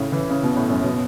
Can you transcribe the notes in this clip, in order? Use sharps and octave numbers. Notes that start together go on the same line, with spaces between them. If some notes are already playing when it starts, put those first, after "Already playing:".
Already playing: A2 C#3
E3
C#3
B2
A2
F#2
B2